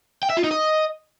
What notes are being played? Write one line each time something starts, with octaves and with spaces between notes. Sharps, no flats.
G5
E5
F4
D#4
D#5